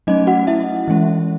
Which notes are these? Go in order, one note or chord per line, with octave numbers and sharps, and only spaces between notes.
F#3 A3 C#4 D#4 D#5
F#4 F#5
E4 E5
E3 G#3 C#4